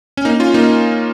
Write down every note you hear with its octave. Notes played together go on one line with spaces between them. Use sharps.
C#4
A#3 D#4
C#4 F4
A#3 D#4